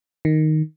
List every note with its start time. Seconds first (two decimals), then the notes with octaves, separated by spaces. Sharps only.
0.25 D#3